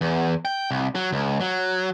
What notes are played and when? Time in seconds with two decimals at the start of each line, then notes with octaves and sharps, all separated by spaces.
0.01 E2
0.45 G5
0.71 C2
0.95 F#3
1.12 C#2
1.40 F#3